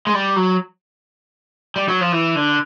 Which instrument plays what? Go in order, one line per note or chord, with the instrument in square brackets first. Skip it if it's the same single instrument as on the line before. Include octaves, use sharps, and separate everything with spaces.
[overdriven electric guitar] G#3
G3
F#3
G3
F#3
F3
E3
D3